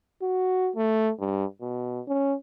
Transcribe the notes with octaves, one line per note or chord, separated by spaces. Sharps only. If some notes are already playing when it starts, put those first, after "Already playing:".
F#4
A3
G2
B2
C#4